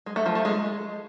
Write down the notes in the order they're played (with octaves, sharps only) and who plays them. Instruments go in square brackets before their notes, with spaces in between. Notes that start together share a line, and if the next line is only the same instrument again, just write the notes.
[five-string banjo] G#3
A3
F3
A3
G#3